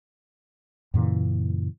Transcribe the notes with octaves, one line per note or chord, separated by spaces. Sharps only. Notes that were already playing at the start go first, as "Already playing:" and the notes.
F#2 A#2 C#3 E3